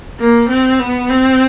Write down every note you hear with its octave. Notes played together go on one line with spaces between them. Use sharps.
A#3
C4
B3
C4